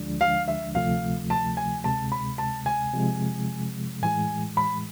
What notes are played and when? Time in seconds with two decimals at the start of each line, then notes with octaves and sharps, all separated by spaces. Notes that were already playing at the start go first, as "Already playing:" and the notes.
Already playing: D2 D3 F3 G#3 D4
0.21 F5
0.48 E5
0.75 D2 C3 F3 A3 F5
1.30 A5
1.57 G#5
1.84 D2 C3 G#3 A5
2.12 B5
2.38 A5
2.66 G#5
2.94 C3 F3 G#3
4.02 A2 E3 G#3 G#5
4.57 B5